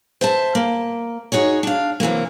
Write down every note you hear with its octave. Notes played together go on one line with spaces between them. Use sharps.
C5 E5 A5
A#3
D#4 F#4 G#4 C#5
D4 F5
C3 E3 F#3 A#3